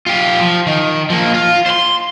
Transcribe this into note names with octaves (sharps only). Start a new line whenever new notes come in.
F4 G4
F3
D#3
F3 A#3
F4
C5 C6